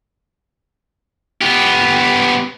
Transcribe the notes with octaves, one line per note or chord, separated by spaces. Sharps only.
B3 G4